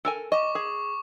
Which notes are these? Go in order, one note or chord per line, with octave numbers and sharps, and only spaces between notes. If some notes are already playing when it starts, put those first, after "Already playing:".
A4 A#4 G#5
D#5 C#6 D6
G#4